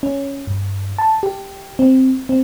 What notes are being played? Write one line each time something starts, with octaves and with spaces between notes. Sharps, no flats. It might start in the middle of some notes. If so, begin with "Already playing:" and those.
C#4
G2
A5
G4
C4
C4